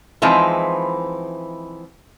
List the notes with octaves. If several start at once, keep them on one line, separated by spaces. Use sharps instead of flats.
E3 F3 G#3 C4 D#4 E4